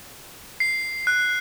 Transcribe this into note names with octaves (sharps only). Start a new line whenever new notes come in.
C7
F#6